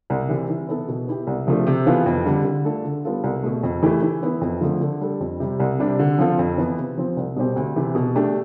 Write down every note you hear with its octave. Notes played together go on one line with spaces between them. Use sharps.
C2
C3 E3
E3
B3 E4 A4
B2
B3 E4 G4
C2
C3 F3 A3 D4
C3
E3 B3 F4 A4
F2
D3 G3
D3
A3 D4 F4 A4
D3
G3 B3 F4 A4
C2
B2 A3
F2
E3 A3 E4 G4
E3
B3 E4
F2
D3 F3 A3
D3
G3 D4 A4
F2
C3 G3
C2
C3 G3 D4
D3
F3 C4 F4 A4
F2
E3 B3
C3
F3 C4
C2
B2 G3 C4 G4
D2
C3 E3
B2
A3 D4 G4